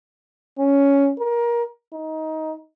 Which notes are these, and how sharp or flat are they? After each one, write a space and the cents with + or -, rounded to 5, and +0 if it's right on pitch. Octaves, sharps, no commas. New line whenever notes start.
C#4 +10
A#4 +25
D#4 +20